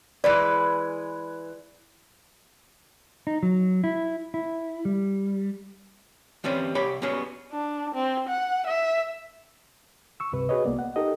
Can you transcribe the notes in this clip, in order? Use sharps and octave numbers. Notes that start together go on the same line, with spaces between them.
E3 G#3 B4 D5
D#4
F#3
E4
E4
G3
E3 G3 C4 C#4 B4
C2 G4 C#5 B5
G3 B3 C#4 F#4 G#4
D4
C4
F#5
E5
C#6 E6
C#2 G2 C3 B4
F#4 G#4 B4 C#5 D#5
C2 A#3 B3 D5
F#5
D#4 G4 A4 A#4 D#5